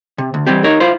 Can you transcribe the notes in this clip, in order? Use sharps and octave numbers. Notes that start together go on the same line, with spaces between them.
C3
D2
E3 G3 C4 G4
D#4 A#4 C#5
E4 F4 C5